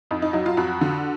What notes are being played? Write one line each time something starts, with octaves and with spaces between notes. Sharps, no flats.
F2 D#4
D#4
F#3 D#4
F4
F2 F#4
D3